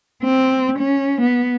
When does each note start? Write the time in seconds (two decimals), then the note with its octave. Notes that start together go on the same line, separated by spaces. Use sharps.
0.23 C4
0.79 C#4
1.21 B3